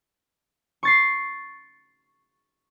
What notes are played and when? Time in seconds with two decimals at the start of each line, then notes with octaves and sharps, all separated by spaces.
0.83 C#6 A6 C7